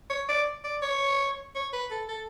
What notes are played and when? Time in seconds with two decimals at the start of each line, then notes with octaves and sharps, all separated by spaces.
0.10 C#5
0.29 D5
0.64 D5
0.82 C#5
1.55 C#5
1.73 B4
1.91 A4
2.08 A4